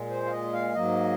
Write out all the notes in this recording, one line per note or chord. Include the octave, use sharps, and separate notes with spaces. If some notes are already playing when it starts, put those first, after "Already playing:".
Already playing: A#2 G#3
C5
F5
D#5
F5
G#2 F#3 A#3 D#5